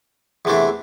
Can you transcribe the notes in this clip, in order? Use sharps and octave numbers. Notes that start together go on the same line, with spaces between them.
E2 C3 E3 A3 D4